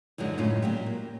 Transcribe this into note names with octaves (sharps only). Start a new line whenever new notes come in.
F#2 D3 F3 F#3 G#3 D#4
F#2 A2 C#3 G#3 F4
A#2 F#3 G4
A#3